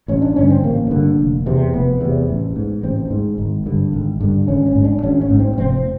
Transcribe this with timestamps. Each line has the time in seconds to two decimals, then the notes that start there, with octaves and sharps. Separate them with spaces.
0.08 A1 C#4
0.22 D4
0.36 G2 D3 C#4
0.50 C4
0.63 A1 A#3
0.91 G2 D3
1.18 F1
1.46 E2 C3
1.73 F1 B3
2.01 E2 C3
2.29 A1
2.56 G#2
2.83 A1 C4
3.11 G#2
3.38 G#1
3.66 G2 D3
3.93 G#1
4.21 G2 D3
4.48 G#1 C#4
4.66 C#4
4.75 G#2
4.85 D4
5.02 G#1 C#4
5.21 C#4
5.30 G#2
5.40 C4
5.58 F1 C4